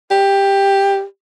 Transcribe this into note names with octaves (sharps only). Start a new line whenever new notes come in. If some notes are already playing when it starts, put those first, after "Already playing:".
G4